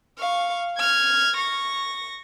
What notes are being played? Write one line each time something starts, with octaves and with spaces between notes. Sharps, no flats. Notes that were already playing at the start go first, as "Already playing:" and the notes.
F5 C#6
F6 G#6
C#6 A#6